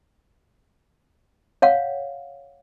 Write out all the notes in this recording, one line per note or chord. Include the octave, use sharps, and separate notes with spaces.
C#5 F5 F#5